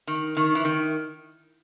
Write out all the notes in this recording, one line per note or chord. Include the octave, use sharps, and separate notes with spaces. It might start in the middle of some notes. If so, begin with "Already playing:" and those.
D#3
D#3
E3
D#3